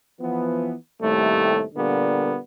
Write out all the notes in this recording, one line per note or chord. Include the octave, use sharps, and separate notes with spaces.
E3 F3 B3
D#2 A2 C3 G3 A3
A#2 D3 G3 A#3 B3